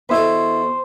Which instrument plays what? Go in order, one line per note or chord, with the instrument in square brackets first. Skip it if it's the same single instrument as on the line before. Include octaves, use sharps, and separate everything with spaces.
[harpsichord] E2 B2 A4 [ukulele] E4 B4 [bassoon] C5